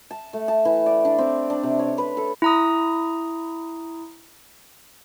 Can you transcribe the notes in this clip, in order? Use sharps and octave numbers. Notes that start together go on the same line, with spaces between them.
A5
A3
A5
E3
D5
D4
C4
D4
C3
C#5
B4
A4
E4 A#5 D#6